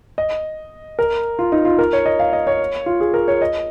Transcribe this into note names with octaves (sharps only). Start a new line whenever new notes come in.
D#5
A#4
F4
D#4
F4
A#4
C#5
D#5
F5
D#5
C#5
F4
G#4
A#4
C#5
D#5